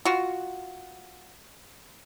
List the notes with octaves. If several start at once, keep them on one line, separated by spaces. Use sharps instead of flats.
F4 F#4